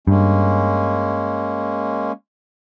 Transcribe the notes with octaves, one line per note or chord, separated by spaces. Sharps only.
G2 G#3 A#3 C#4